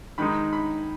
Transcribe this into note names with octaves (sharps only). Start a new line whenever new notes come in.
D#3 G#3 D#4 B5
B5